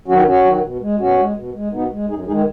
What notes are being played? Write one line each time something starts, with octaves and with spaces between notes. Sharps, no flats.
D#3 F#3 C#4 F#4
F#2 C#4 F#4
D#3 F#3
B2
G#3
B2 C#4 F#4
G#3
B2
G#3
B2 B3 D#4
G#3
F#2 D#4 G#4
D#3 G#3 D#4 G#4